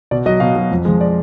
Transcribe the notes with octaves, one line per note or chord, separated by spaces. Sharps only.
B2 D5
F#3 D#5
B2 F5
F#3
F2
F3 G#3
D5